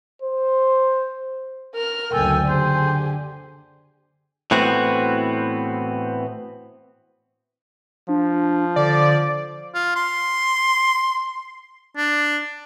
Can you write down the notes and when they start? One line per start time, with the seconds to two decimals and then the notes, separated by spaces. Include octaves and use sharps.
0.22 C5
1.74 A#4 F6
2.13 F#1 D2 A4 G5 G#5
2.47 D3 G4 G#4 C5
4.51 A2 E3 B3 C4 F#4
8.09 F3 D4
8.76 D3 D5
9.75 F4
9.96 C6
11.97 D4